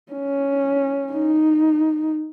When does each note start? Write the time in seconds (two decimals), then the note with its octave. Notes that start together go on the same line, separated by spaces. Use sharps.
0.12 C#4
1.13 D#4